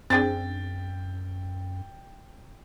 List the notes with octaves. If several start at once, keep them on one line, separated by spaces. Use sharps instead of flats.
F#2 C4 D4 G#4 G5 A6